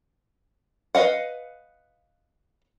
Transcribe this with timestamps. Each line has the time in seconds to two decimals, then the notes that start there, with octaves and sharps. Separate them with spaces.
0.95 B4 D#5 F5 F#5